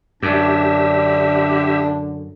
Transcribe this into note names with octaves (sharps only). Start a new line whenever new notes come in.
F#2 D3 D4 G4 E5